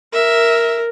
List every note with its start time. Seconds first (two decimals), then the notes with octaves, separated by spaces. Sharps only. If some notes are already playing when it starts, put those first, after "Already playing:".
0.13 A#4 E5